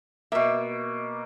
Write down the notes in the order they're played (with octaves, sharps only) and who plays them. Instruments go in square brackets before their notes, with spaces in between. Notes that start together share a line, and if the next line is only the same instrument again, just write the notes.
[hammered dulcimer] B2 A#3 [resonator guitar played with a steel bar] E5